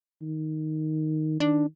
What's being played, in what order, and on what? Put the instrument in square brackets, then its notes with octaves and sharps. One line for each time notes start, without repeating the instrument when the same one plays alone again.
[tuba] D#3
[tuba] D#3 [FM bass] D4